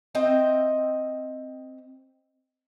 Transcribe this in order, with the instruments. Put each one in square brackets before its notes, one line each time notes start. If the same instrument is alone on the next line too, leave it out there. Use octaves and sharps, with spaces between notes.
[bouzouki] C4 D#5 E5 G5